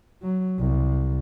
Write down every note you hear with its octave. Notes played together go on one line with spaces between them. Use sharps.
F#3
C2